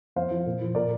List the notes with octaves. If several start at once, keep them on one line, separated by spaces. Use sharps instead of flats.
F2 C5 F5
F3
A#2
F3
A#2 A#4 D5